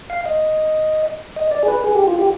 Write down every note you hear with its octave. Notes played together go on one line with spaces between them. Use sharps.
F5
D#5
D#5
D5
G#4
B4
G#4
G4
F4
G4